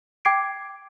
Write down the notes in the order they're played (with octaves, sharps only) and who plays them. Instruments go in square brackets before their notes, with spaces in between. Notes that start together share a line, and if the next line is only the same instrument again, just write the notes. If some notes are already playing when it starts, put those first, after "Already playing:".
[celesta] G5 D6 G#6 C7 D7